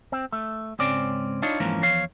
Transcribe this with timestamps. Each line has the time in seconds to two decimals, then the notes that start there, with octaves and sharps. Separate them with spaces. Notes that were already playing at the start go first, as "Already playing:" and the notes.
0.12 C4
0.32 A3
0.79 C#2 G#2 C4 C#4 D5
1.42 D4 D#4 F4 C#5
1.60 F2 G#2 E3 F3 A#3 C#4
1.82 E2 F3 C#5 F5